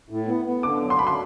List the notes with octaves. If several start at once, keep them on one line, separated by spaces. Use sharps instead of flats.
A2
B3
B3
D3 D6
F#3
C6
F#3 B5
C6